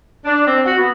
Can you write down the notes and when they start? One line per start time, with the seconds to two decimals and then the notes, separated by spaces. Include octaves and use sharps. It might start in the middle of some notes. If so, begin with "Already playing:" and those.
0.25 D4
0.46 C4
0.65 F#4
0.78 B3